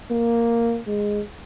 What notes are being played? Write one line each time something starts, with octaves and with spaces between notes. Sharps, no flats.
A#3
G#3